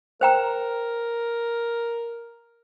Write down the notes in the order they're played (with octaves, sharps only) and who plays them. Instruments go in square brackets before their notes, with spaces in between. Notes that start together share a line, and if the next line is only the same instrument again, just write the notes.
[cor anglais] A#4 [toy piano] C5 G5 A#5